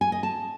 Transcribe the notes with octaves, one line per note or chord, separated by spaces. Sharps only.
G#5
D#5
A5